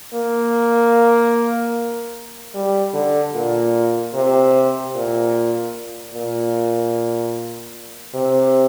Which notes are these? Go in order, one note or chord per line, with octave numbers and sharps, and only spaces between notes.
A#3
G3
D3
A#2
C3
A#2
A#2
C3